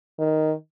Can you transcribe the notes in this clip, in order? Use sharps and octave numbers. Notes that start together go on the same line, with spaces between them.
D#3